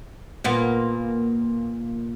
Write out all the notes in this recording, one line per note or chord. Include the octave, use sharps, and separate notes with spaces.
A#2 A#3 B3